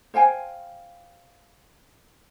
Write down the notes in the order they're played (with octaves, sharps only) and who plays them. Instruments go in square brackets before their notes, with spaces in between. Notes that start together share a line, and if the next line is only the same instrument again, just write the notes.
[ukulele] C5 F5 G5 G#5